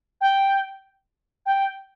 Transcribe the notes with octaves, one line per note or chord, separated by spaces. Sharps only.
G5
G5